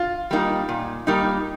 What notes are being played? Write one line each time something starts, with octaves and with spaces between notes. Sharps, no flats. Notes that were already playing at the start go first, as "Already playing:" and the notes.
Already playing: F4
G3 A#3 D#4
A#2
G3 A#3 D#4